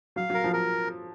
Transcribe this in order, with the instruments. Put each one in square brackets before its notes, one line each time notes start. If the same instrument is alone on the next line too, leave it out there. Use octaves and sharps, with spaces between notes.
[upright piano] F#3 [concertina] F5
[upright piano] F#3
[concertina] A#4
[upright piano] F3
[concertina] A#4